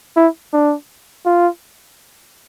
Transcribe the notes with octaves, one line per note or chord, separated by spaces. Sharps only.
E4
D4
F4